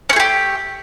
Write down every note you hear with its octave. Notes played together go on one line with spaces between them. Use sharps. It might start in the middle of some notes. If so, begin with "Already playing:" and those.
A3 C#4 G4 G#4